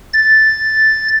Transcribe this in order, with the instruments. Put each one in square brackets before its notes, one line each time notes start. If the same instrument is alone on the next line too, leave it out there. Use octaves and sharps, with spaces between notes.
[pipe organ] A6